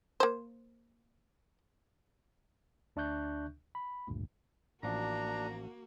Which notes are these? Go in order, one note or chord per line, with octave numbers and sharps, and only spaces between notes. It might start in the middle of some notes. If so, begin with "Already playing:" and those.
A#3 C5
D2 D4 E5 C#6 F#6 G6
B5
G#1 D2 G2 A#2
A1 F3 A#3 D4 F#4 A#5